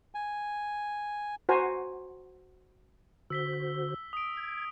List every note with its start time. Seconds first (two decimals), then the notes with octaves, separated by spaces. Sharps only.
0.14 G#5
1.49 F#4 C5 G#5 A#5
3.30 D3 F#4 C5 E6 B6 G7
4.13 D#6 D7
4.37 G#6